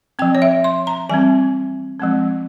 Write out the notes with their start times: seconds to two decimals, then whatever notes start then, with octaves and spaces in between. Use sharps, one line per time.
0.19 F3 C4 G5
0.35 C#5
0.42 E5
0.64 C6
0.87 A#5
1.09 E3 G3 C4 G#5
2.00 F3 G#3 C4